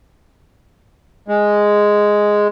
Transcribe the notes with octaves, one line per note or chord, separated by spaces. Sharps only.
G#3